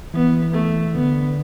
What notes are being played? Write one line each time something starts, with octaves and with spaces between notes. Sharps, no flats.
E3 B3
A3
D3 B3